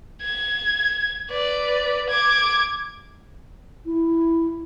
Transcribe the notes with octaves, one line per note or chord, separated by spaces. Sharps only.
G#6
B4 D5
D6 G#6
E4